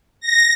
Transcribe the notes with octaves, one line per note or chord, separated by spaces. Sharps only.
A#6